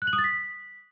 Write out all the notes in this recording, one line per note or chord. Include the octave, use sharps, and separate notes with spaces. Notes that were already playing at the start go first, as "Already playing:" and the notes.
F#6
F#7
D#6
A6
B6